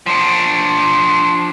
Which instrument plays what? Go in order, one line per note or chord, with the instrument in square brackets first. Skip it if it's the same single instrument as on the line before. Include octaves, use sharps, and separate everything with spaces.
[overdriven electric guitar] F3 D4